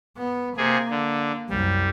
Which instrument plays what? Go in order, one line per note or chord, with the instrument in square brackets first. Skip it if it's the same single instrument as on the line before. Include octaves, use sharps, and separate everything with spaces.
[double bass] B3
[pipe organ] C3 G#4 [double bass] A#3
[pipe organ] D3
[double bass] C2 F#2 [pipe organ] G3